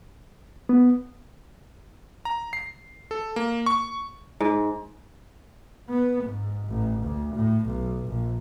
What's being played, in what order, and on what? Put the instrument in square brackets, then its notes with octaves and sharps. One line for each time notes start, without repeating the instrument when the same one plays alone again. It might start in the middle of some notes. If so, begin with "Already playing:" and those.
[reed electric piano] B3
[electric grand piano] A#5
C7
A4
A#3
C#6
[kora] G#2
[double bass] B3
G#2
A1
D2
A2
B1
A#1